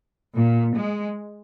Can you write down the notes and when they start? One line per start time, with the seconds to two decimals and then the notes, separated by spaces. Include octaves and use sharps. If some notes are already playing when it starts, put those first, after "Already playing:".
0.35 A#2
0.75 G#3